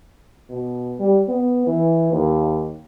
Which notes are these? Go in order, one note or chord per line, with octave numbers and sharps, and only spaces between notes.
B2
G3
B3
E3
D#2